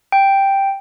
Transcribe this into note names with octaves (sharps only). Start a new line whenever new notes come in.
G5